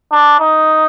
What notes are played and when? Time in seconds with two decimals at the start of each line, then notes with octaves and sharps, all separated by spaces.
0.12 D4
0.40 D#4